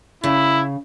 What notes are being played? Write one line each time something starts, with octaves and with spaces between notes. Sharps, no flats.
C#3 E4